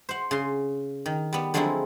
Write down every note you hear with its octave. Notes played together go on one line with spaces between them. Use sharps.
C5 F#5
C#3 C6
D#3
G3 B3
D3 F3 F#3 G#3 C4 E4